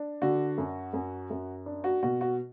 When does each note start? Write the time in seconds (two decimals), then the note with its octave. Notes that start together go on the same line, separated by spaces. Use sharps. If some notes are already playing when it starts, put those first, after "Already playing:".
Already playing: D4
0.22 D3 F#4
0.58 F#2
0.93 F#2
1.30 F#2
1.66 D4
1.84 F#4
2.03 B2 F#4
2.21 F#4